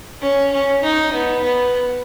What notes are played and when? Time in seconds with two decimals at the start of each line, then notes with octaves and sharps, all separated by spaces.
0.21 C#4
0.52 C#4
0.83 D#4
1.13 B3
1.43 B3